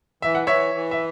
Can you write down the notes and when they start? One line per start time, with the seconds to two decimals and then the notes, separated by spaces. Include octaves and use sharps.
0.22 E3 E5
0.35 F#5
0.47 E3 C#5 E5
0.75 E3
0.91 E5